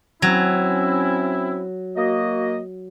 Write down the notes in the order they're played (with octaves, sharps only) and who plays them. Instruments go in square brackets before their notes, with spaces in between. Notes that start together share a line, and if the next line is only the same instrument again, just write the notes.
[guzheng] F#3 [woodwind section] C4 C#4 E4
[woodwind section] A#3 F#4 D#5